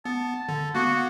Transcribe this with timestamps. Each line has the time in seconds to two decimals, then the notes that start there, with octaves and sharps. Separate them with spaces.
0.05 B3 A5
0.49 D3
0.75 A#3 B3 F#4